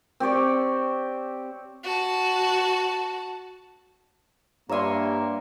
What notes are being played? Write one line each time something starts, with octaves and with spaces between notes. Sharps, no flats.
C4 G4 C#5 D5
F#4 A5
G2 A#3 C#5 D5 E5 A#5 C6